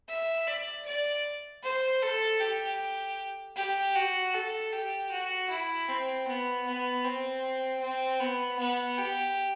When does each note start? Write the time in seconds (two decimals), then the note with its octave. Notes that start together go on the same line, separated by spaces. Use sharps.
0.09 E5
0.47 D5
0.86 D5
1.63 C5
2.02 A4
2.41 G4
3.56 G4
3.95 F#4
4.34 A4
4.73 G4
5.11 F#4
5.50 E4
5.88 C4
6.27 B3
6.66 B3
7.04 C4
7.81 C4
8.20 B3
8.59 B3
8.98 G4